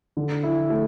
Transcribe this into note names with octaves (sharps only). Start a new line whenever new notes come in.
D3
E4
A3